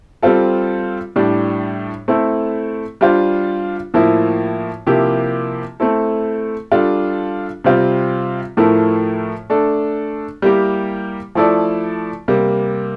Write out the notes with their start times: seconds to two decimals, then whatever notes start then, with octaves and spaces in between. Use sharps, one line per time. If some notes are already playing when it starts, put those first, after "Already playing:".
0.22 G3 C4 F4 A4
1.16 A2 G3 D4
2.08 A3 C4 E4 A4
3.01 G3 D4 F4 C5
3.94 A2 F3 A#3 E4
4.87 C3 F3 A#3 E4 G4
5.80 A3 C4 E4 A4
6.72 G3 D4 F4 A4
7.64 C3 G3 C4 F4
8.57 A2 F3 A3 E4 A#4
9.50 A3 D4 A4
10.42 G3 A#3 E4 G4 A#4
11.35 F3 A3 E4 A4 D5
12.28 C3 G3 A#3